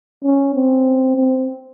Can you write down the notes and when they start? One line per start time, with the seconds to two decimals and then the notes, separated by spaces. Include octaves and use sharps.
0.24 C#4
0.54 C4
1.16 C4